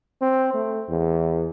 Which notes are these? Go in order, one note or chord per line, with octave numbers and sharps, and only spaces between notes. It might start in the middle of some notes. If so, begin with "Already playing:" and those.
C4
A3
E2